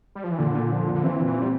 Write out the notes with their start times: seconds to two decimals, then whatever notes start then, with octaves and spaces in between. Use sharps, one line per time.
0.15 G3
0.24 F3
0.32 E3
0.39 A#2 D3
0.55 A#2
0.72 F3
0.87 A#2
0.95 D3
1.04 E3 C4
1.20 A#2
1.26 E3
1.37 C4
1.42 G3